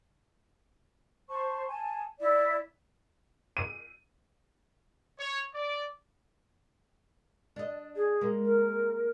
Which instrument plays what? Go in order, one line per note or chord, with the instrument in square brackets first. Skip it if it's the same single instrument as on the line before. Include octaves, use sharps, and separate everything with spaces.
[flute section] C5 A5 C6 C#6
G#5 A5
E4 D5
[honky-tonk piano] D#7
[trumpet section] C#5
D5
[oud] D4 D#5
[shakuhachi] G#4
[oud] G#3 A#3
[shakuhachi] A#4